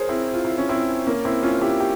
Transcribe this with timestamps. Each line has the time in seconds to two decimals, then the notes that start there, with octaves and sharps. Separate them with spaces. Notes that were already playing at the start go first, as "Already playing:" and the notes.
Already playing: G#4 A#4 C5 C#5
0.09 C4 E4
0.34 F4
0.45 E4
0.58 C#4
0.69 C4 E4
1.07 A#3 C#4
1.25 C4 E4
1.43 C#4 F4
1.61 E4 G4
1.80 G4